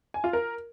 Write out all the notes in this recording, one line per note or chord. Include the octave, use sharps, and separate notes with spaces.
G#5
F4
A#4